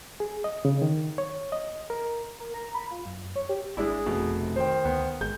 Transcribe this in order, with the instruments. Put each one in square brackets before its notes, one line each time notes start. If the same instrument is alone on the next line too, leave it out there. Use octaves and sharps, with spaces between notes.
[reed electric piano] G#4
D#5
C#3
D#3
C#5
D#5
A#4
[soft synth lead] A#4
A#5
B5
F4
F#2
C#5
G4
[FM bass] G#1 [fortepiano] G#3 D4 E4 [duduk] G#4
[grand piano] F1 [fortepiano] B2
[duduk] C3
[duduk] D#3 [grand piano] C5 G5
[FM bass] D2 [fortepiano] B3
[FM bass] G#1 [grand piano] G#3 G6